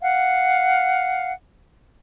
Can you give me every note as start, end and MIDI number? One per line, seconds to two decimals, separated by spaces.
0.01 1.31 77
0.01 1.31 78